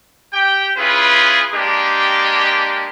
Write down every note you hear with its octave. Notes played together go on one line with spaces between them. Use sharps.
G4 G5
C#4 E4 F4 G#4 B4
G#3 A#3 D4 G4